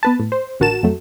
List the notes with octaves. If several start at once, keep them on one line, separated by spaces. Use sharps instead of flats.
B3 B4 A5
A2
C5
A1 D3 F#4 A#4 A5 E7
F2 F#3 A3